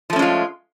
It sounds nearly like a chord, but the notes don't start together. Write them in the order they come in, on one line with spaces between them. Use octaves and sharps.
F3 A3 C#4 G#3 F4